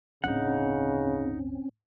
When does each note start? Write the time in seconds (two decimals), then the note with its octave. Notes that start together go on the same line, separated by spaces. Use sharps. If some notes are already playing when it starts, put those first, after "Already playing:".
0.24 D1 G1 C#3 C4 C#4 D#4 F#5